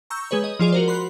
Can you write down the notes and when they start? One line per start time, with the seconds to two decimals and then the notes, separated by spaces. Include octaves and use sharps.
0.10 A#5 C#6 E6 G6
0.31 G#3 G#4 B4 C#5
0.44 D#5
0.59 F3 F4 G#4 D5
0.72 F#4 A#4 C5
0.88 B5 C6 F#6